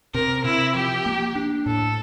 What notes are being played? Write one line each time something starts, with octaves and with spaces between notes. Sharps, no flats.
C3 A#4
C3 E4
F3 G4
A#3
D4
A2 A4